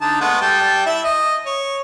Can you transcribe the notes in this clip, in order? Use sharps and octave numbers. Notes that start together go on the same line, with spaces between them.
D3 D#4 A5
G#3 A3 B3
G3 G5 A5
E4 E5
D#5
C#5